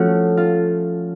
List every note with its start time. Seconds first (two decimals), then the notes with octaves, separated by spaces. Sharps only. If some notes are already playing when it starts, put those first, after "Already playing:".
Already playing: F3 A3 C#4 F#4
0.37 F4